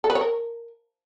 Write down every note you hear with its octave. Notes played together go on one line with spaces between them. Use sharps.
A4
B4
C#5
A#4